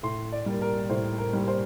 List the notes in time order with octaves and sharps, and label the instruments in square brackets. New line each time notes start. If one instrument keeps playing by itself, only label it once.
[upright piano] A2 C6
D5
G3 A#3
A#4
A2 C5
A#4
G3 A#3
C5